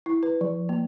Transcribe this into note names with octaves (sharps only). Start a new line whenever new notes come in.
E4
B4
F3
A#3